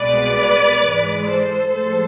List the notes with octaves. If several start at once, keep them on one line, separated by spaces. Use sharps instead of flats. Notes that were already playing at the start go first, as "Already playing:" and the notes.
Already playing: C2 B2 G#3 B4 D5
G#2 E3 G#3
A4 C5
A2 F3 G#3 A4 C5